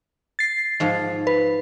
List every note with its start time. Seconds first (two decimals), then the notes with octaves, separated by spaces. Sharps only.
0.39 A6 C7
0.80 G#2 F3
1.27 B4